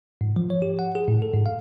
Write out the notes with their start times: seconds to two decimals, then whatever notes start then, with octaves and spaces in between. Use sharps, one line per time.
0.21 G#2
0.36 F3
0.50 C#5
0.62 G4
0.79 F#5
0.95 G#4
1.08 A2
1.22 A4
1.33 G#2
1.46 F5